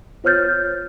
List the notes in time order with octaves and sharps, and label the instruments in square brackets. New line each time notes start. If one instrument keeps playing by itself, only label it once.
[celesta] F4 C5 C#5 F6 G6 A6